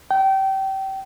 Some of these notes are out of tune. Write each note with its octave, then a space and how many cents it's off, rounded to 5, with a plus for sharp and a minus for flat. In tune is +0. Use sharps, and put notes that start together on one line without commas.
G5 -25